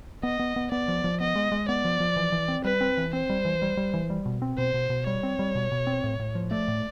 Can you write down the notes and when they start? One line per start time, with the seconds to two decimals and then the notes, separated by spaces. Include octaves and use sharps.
0.23 B3 D#5
0.39 B3
0.56 B3
0.71 B3 D5
0.88 F3
1.04 F3
1.20 B3 D#5
1.36 G#3
1.52 G#3
1.68 B3 D5
1.85 F3
2.00 F3
2.16 E3
2.32 E3
2.48 C4
2.64 G3 B4
2.81 C4
2.97 E3
3.13 C4 C5
3.30 G3
3.45 E3
3.62 G3
3.77 G3
3.94 E3
4.10 G3
4.26 B2
4.42 C4
4.58 B2 C5
4.74 B2
4.90 B2
5.07 G3 C#5
5.23 C4
5.39 G3
5.55 B2
5.72 B2
5.87 C4
6.04 A2
6.19 A2
6.35 F3
6.51 A3 D5
6.68 A2